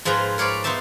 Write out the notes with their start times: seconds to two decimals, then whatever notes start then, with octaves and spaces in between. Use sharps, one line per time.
0.05 G#2 F3 G#4 B4 A#5
0.38 A#4 C#5 D5 F5 B5
0.64 B3 D#4 C5 E5 A5